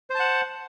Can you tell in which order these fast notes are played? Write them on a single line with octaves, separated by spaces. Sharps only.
C5 A5 F#5